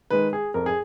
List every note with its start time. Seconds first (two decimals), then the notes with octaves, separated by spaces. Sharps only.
0.10 D#3 G#3 B4
0.33 G#4
0.54 F2 A#4
0.66 G#4